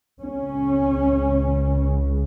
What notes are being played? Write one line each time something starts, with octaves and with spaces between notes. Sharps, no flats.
C#2 C#3 C#4